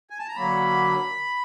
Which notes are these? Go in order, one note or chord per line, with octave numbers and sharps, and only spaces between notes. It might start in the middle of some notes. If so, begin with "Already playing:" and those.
G#5
A5
A#5
D3 F#3 A#3 B5